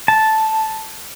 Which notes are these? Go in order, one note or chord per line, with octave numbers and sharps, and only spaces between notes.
A5